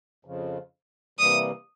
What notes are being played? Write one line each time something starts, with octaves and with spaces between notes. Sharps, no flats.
F2 C#3 F3
C3 E3 G3 A#3 D#6